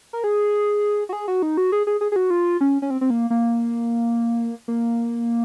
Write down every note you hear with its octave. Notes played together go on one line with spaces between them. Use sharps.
A#4
G#4
F#4
G#4
F#4
D#4
F#4
G#4
G#4
G#4
G#4
F#4
F4
C#4
C#4
C4
C4
A#3
A#3
A#3